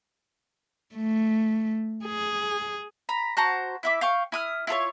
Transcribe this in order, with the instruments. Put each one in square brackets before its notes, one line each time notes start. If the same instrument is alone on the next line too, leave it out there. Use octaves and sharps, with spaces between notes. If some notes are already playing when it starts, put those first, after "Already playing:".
[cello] A3
G#4
[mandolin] A#5 B5
F#4 C5 A5 A#5
E4 E5 D6
F5 G5 C#6
E4 D#6 F6
E4 F4 A4 C#5